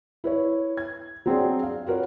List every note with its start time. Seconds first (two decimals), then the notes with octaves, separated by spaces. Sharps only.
0.24 E4 B4 C#5
0.77 G#6
1.26 F#3 C4 D4 G#4
1.63 F5
1.86 F4 F#4 A#4 B4 C#5